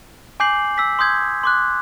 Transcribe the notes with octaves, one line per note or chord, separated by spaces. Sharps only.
G#5 D6 G6 C7 F#7
E6 B6
C6 D#6 G6 G#6
C6 D6 F#6